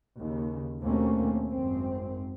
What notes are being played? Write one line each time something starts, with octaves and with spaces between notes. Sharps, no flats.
D#2 C#3
D#2 B2 A3 A#3 C4 C#4
G#1 F#2 C4